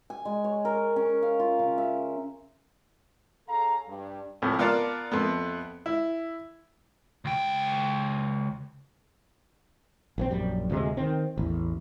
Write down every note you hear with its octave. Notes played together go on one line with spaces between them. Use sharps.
G#5
G#3
C#5
A#4
C#4
F5
F4
C#3
E5
C#4 G#4 A4 F5 A#5
G2
C2 A2 C3 F3
B3 F4 A#4 D5 F5 A5
F2 A3 B3
E4
C#2 G5
A#1 E3 C4
A#1 F#2 G3
D2 C3 G#3
D#3 C4
A1 E2